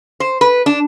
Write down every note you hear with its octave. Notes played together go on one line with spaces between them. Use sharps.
C5
B4
D4